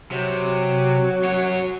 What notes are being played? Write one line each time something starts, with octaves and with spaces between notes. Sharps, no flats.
C3 F#3
F#2 C#5